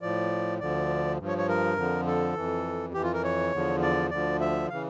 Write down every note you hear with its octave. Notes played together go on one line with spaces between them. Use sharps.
A2 F3 D5
D2 D3 F3 D5
G2 F3
C#5
C#5
A#4
F2 D3 F3
A4
F2 E3
F2 E3 G4
F4
A#4
C#5
E2 D3 F3
D5
D2 D3 F3 D5
E5
C#3 E3 F5